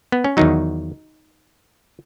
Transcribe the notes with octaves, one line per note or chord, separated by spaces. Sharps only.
B3
C#4
E2 D#3 F#3 D#4